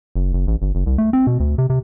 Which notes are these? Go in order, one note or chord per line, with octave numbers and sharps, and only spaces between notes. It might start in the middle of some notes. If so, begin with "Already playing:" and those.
F#1
F#1
A1
G1
F#1
C2
A3
C4
B2
D2
C3
C3